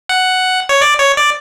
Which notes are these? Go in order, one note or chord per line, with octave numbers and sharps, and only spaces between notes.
F#5
C#5
D5
C#5
D5